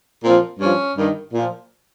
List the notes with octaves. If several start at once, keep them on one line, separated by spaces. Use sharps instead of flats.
A#2 F3 C4
G2 F3 C#4
G2 D#3
A#2 F3